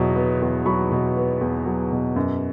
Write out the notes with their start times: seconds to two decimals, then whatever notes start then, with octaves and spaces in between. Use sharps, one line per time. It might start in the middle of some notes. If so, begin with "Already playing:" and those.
Already playing: E2 B2 F#3
0.16 B3
0.42 E2
0.66 F#3 B5 C#6
0.92 B2
1.17 B3
1.41 E2
1.66 F#3
1.92 B2
2.16 F#2